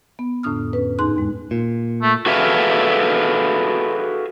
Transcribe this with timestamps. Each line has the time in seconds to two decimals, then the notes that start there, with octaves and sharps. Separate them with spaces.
0.19 B3
0.43 F2 A2 D3 D4 D#6 F6
0.73 C#4 B4
0.99 E2 G#2 D#4 G#4 C6 F#6
1.16 D#2 G#3
1.51 A#2
2.03 A3
2.26 F#4 G#4 A4 B4 E5 F5